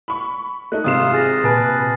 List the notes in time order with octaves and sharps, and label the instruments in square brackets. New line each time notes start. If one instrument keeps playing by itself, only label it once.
[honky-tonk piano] B5 C#6
[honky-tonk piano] A3 D#4 [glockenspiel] F#6
[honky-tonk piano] G#1 C3 E7 [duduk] F4 [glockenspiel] D#6 C7
[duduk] G#4 [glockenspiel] F6 A6 A#6
[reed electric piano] A#2 [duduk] B4 [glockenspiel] G#5 A5 A6